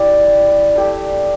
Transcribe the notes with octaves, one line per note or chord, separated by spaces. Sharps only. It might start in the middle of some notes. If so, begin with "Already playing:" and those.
Already playing: E4 G4 D5
A3 E4 G4 D5